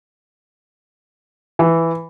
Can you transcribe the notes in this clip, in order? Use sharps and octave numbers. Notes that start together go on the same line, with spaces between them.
E3